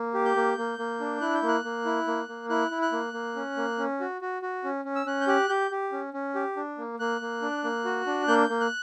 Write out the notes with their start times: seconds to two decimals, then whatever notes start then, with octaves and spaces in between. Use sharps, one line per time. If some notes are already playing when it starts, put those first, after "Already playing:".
Already playing: A#3
0.14 G4
0.25 G6
0.36 A#3
0.58 A#3
0.79 A#3
1.00 D4
1.21 E4 F#6
1.34 G6
1.43 A#3
1.48 F#6
1.64 A#3
1.85 E4
2.07 A#3
2.28 A#3
2.50 E4 F#6
2.71 E4
2.82 F#6
2.92 A#3
3.13 A#3
3.36 C#4
3.57 A#3
3.78 C#4
4.00 F#4
4.21 F#4
4.42 F#4
4.64 C#4
4.85 C#4
4.95 E6
5.06 C#4 F#6
5.21 G6
5.28 G4 F#6
5.49 G4 G6
5.71 G4
5.92 C#4
6.13 C#4
6.35 G4
6.57 D4
6.78 A#3
7.00 A#3 F#6
7.21 A#3
7.42 D4
7.64 A#3
7.85 F#4
8.06 D4
8.28 A#3 G6
8.49 A#3
8.60 F#6